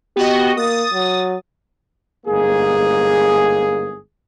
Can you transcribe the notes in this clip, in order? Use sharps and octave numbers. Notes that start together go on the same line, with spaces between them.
B3 F#4 G4 D#5
A#3 D#6 A6
F#3
G1 G#2 A#3 G#4